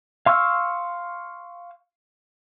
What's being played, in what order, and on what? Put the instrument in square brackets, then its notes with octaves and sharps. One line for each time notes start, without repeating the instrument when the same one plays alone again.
[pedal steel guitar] F5 C6 C#6 E6 F6